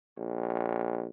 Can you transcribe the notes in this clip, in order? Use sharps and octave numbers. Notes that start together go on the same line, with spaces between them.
A#1